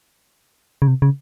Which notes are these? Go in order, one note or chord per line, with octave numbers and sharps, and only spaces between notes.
C#3
C3
C#3